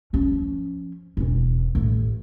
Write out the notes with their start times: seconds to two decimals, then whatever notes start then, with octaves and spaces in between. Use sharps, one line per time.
0.13 F3 C#4
1.17 E1 E3
1.75 A1